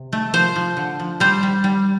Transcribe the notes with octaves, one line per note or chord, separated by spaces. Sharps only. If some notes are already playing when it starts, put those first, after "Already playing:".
Already playing: C3
A3
F3 C5
F3
D3
F3
G3 C5
G3
G3